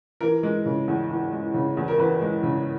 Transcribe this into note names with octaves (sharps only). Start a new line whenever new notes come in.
E3 A#4
G#3
C#3
E2
E3
G#3
C#3
E2
A#4
E3 B4
G#3
C#3